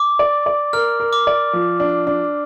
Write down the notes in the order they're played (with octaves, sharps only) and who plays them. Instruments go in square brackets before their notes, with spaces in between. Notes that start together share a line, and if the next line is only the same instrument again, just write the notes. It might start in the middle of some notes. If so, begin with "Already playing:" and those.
Already playing: [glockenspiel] D6
[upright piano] D5
D5
[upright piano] A#4 [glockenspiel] F6
[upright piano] A#4
[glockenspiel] D6
[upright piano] D5
F3
D4
D4